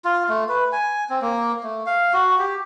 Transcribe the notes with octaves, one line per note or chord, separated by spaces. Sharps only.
F4
A3
B4
G#5
C4
A#3
A3
F5
F#4
G4